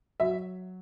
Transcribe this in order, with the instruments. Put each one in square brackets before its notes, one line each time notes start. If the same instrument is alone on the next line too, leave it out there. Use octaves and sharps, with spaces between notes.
[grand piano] F#3 [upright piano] E5